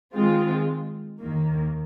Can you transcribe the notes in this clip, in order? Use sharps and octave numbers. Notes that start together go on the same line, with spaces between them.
D#3 G#3 C4 F4
D#2 D#3 A#3